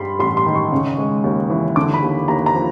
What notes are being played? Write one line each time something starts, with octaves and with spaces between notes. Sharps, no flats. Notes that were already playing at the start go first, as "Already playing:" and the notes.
Already playing: G2 G3 B5 C6
A1 C6
C6
D#3
C#6
C#3
G#3
D#2
E3
D3 D6
B5
D#2
D#2 A#5
A#5
F3